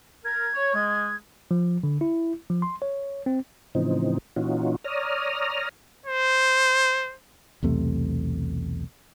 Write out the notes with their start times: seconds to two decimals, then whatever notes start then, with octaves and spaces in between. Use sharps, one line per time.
0.25 A#4 G#6
0.54 C#5
0.74 G#3
1.51 F3
1.84 D3
2.01 E4
2.50 F3
2.62 C6
2.82 C#5
3.26 C4
3.75 A2 C#3 E3 F3 C4 D#4
4.36 A#2 E3 C#4 D#4 F4 F#4
4.84 C#5 D5 A#5 D#6 F6
6.06 C5
7.63 B1 E2 C3 A3